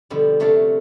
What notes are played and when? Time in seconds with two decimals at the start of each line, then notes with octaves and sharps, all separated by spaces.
0.10 B2 D3 F3 G3
0.40 C3 A3 D4 C#5 F5 A5